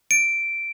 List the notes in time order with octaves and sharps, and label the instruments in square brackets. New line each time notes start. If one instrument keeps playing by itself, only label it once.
[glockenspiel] D7